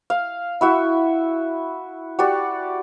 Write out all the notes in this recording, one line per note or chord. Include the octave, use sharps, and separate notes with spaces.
F5
E4 F#4 E5
F#4 G4 D5